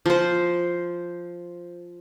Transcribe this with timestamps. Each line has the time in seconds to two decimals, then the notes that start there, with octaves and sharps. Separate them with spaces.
0.06 F3 C5